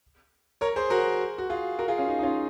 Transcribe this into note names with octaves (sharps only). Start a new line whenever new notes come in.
A#4 C#5
G#4 C5
F#4 A#4
F#4
F4 G#4
F#4 A#4
F4 G#4
C#4 F4
D#4
D#4
C#4 F4